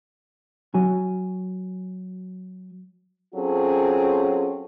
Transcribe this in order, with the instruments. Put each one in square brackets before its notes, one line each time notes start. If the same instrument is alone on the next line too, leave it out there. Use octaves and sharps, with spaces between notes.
[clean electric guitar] F#3 F#4 G#5
[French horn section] F#3 C4 C#4 F4 G#4 A4